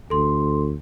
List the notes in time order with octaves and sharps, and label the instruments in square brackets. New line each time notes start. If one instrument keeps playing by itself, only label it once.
[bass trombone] D2 [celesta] A4 C6